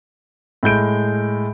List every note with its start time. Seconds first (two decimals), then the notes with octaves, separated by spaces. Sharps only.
0.63 A2 G#3 G6 D7